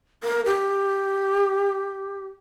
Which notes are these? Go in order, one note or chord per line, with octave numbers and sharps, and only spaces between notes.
A#4
G4